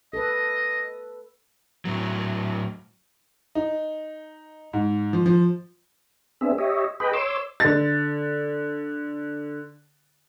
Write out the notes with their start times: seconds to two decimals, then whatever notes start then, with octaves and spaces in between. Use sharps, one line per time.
0.13 A4 B4 D#5
1.85 A2 F#3
3.55 D#4
4.73 G#2
5.13 F3
5.26 F3
6.41 B3 C4 D4 G#4 E5
6.58 G4 C#5 D#5 E5
7.00 G#4 B4 D#5 G5 B5
7.13 C#5 C6 D6 E6
7.60 D3 A6